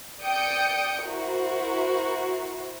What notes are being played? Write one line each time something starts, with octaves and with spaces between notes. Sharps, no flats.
D5 G5 D#6 G6 C#7
E4 F#4 A#4 C5